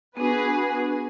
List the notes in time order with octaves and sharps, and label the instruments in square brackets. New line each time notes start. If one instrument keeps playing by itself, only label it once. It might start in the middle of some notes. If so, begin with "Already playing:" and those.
[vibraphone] B3 D4 [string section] F#4 G#4 B4